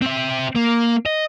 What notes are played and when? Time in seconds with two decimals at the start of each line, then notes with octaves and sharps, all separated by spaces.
0.01 C4 E5
0.56 A#3
1.06 D#5